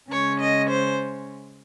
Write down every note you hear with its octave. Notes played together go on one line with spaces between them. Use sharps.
C#3 G#3 C#4 C#5
D#5
C5